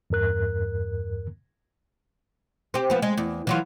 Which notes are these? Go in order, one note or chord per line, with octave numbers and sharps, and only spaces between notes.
E2 G2 A#4 F#6
C4 G4
F3 B3
G#3
E2
E3 F#3 F4